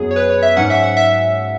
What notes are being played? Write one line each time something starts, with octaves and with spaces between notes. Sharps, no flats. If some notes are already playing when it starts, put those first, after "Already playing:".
Already playing: F#2 F#3 B3 G#4
C#5
B4
C#5
E5
G#2 F#3 C#4 F#5
E5
F#5
E5